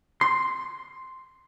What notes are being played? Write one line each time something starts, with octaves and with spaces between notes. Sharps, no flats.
C6